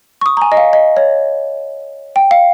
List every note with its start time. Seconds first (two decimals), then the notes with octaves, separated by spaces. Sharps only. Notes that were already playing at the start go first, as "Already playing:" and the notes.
0.21 C#6
0.26 D#6
0.37 A#5
0.42 G#5
0.52 D#5
0.57 F5
0.73 D#5
0.97 C#5
2.16 G5
2.31 F5